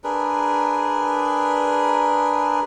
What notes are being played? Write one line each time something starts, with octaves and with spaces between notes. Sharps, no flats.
D4 G#4 A#4 B4